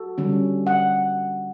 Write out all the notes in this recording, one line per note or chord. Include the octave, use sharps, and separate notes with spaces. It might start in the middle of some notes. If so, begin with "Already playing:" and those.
Already playing: F#4 A4
D3 G3 C#4
F#5